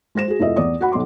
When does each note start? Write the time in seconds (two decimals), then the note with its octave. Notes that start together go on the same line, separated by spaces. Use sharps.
0.15 G#3 C5 A#6 E7
0.28 F#4 G#4
0.40 F1 E4 F4 D#5 E5
0.56 E2 D5 D#6
0.81 F#4 F#5 B5
0.92 B1 F#3 C6 D6